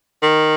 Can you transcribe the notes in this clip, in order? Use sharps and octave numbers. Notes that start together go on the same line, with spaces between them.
D#3